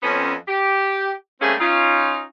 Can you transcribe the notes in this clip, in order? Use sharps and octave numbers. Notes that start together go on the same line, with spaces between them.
F2 B3 C#4
G4
G3 A3 A#3 C4 C#4 G#4
C#4 D#4 F4